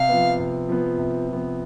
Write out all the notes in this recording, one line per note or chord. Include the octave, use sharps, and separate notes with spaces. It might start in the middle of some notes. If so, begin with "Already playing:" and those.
Already playing: C3 F5
F3 B3
C3
F3 B3
C3
F3 B3